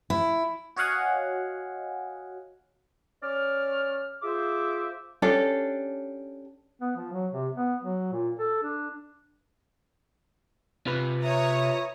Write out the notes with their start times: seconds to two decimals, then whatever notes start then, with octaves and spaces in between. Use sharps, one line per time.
0.10 E4
0.76 F#4 C#5 D#5 F5 F#5 G#5
3.23 C#4 D5 F6
4.22 F4 G#4 C5 E5 D6
5.22 C#4 D4 G4 A4
6.81 B3
6.96 F3
7.12 F#3
7.32 C3
7.55 B3
7.82 F#3
8.12 A#2
8.39 A4
8.63 D4
10.87 C3 F4 B4
11.23 C#5 E5 A#5 D#6